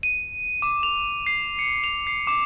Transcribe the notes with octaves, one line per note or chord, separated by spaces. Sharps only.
D#7
D6
F7
C7
C#7
F7
C7
D6